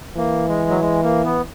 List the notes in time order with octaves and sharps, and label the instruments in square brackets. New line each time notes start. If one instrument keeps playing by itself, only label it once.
[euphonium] E3 [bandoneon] A#3
[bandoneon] G#3
F#3
G#3
A#3
B3